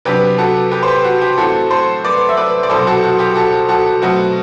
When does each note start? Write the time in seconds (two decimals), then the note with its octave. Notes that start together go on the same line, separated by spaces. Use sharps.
0.05 C3 F#3 B3 D4 G4 B4
0.38 F#4 A4
0.72 G4 B4
0.83 C5
0.88 G4 B4
1.05 F#4
1.21 G4
1.38 A2 E3 A3 C4 F#4 A4
1.71 A4 C5
2.05 B4 D5
2.29 E5
2.37 B4 D5
2.63 D5
2.70 C2 B2 F#3 C4 A4 C5
2.87 F#4 A4
3.03 F#4
3.19 G4
3.36 F#4 A4
3.69 F#4 A4
4.02 B2 F#3 A3 C4 F#4